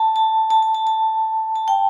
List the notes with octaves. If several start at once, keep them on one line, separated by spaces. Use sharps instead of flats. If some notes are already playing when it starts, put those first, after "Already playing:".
Already playing: A5
A5
A5
A5
A5
A5
A5
G5